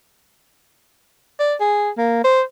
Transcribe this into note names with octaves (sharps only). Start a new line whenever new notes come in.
D5
G#4
A#3
C5